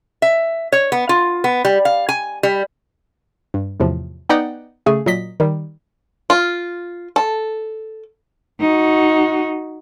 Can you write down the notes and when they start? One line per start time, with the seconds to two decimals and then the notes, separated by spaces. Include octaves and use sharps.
0.22 E5
0.72 C#5
0.92 B3
1.09 F4
1.44 B3
1.65 G3
1.85 F5
2.09 G#5
2.43 G3
3.54 G2
3.80 E2 A2 C3 F3
4.29 B3 D#4 D5 D#5 F#5 G5
4.86 C#3 A3 G#4
5.06 A#2 F#3 D#5 B6
5.40 D#3 G3
6.30 F4
7.16 A4
8.61 D#4 F#4